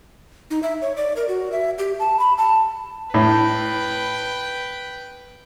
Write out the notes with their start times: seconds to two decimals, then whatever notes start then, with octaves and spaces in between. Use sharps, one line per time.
0.50 D#4
0.63 E5
0.82 C#5
0.97 D5
1.16 A#4
1.28 F#4
1.52 E5
1.78 G4
2.00 A5
2.19 B5
2.38 A5
3.14 A2 B4 G5